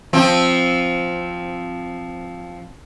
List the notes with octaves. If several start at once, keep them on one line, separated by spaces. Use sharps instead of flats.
F3 C4